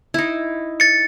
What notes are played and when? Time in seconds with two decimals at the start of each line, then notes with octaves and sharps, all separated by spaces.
0.14 D#4 E4
0.80 A6 C#7